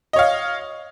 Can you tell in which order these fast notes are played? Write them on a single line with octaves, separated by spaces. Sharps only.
D#5 C#5 F5